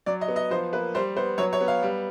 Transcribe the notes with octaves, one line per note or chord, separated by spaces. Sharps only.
F#3 D5
D#5
B3
D#5
F3 C5
A#3 B4
G3 C5
B3 C5
F#3 C#5
C#5
B3
F5
G3